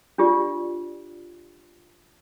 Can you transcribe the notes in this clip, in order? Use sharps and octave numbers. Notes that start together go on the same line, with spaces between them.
D4 F4 G4 D5